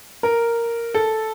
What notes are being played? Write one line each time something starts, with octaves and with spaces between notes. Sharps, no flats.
A#4
A4